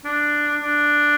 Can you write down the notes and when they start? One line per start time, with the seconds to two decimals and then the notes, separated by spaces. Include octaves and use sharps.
0.05 D4
0.62 D4